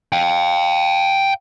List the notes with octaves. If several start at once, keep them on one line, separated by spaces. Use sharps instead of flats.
F5 G5